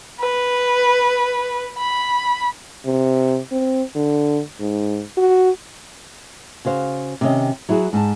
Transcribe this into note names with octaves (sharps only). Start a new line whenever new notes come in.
B4
B5
C3
C4
D3
G#2
F#4
C#3 F#4 C5 F5
C3 D#3 C#4 D#5
F#3 E4 F#4 G#4
G#2 A5